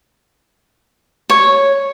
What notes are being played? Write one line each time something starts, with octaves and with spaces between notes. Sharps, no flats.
C#5